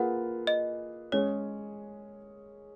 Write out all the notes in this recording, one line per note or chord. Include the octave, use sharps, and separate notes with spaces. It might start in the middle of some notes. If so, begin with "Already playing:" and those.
Already playing: A#3 F4 G#4 B4 F#5
D#5
G#3 C#4 G#4 C#5